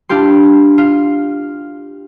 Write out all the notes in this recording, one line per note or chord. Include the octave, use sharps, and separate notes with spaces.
D4 E4 F4 G4 C6
F4